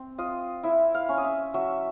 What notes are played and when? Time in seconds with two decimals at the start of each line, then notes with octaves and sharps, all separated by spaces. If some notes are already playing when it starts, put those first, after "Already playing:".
Already playing: C4
0.18 F4 D#5
0.63 E4 E5
0.94 F5
1.09 C#4
1.17 D#5
1.25 E5
1.54 F#3 E5